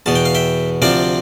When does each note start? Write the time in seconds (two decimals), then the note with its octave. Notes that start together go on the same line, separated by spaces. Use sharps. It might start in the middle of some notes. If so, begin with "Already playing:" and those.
0.06 E2 B2 B3 A5
0.15 G5
0.25 F5
0.35 E5 G5
0.82 D2 C3 F3 C4 D5 F5